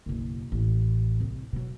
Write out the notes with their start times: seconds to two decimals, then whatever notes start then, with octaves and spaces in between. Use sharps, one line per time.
0.06 F#1 B1
0.52 A1
1.20 C2
1.53 B2 F#3